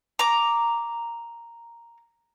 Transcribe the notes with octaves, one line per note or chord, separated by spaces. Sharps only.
A#5 D6